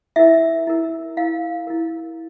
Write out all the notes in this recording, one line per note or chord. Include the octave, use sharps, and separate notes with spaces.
E4 A#4 E5
E4 A#4
E4 A#4 F5
E4 A#4